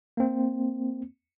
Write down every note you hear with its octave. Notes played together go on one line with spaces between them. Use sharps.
A#3 C4